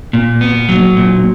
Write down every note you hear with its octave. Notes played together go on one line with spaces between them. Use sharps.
A#2
B3
F#3
A#2